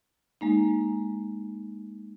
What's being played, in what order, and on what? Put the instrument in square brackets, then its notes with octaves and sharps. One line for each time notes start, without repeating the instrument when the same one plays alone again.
[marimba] G#3 A#3 D#4